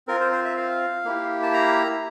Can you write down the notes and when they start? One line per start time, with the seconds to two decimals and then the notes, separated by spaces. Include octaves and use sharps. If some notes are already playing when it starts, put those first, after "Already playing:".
0.08 C4 F4 A#4
0.20 C5
0.32 C5
0.45 E5
0.57 F5
1.05 A#3 E4 G4
1.43 A5
1.54 A#5